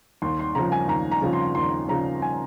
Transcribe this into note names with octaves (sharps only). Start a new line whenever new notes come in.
D#2 C6
C6
C#3 F3 A#5
G#5
D#2 A#5
A#5
C#3 F3
C6
D#2 C6
C#3 F3 A#5
G#5